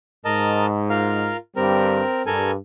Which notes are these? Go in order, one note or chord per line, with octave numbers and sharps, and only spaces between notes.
G#2 A#4 D#5 A5
F4 A#4 F5
G2 D3 G3 C4 A#4
G2 A4 A#4 G#5